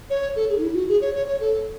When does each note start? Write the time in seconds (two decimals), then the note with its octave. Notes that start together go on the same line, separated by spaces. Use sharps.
0.10 C#5
0.36 A4
0.49 G#4
0.58 D#4
0.62 E4
0.75 F#4
0.89 G#4
1.01 C#5
1.14 C#5
1.27 C#5
1.40 A4